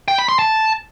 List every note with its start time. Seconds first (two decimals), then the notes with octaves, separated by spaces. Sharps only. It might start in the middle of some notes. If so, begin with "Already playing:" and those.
0.08 G5
0.18 B5
0.29 C6
0.39 A5